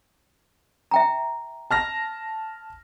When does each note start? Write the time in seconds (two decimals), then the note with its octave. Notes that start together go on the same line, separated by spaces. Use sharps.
0.91 E5 G5 A#5
1.71 A5 F6 A#6